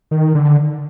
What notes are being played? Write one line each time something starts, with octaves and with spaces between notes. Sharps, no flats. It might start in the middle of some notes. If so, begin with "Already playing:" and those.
D#3
D3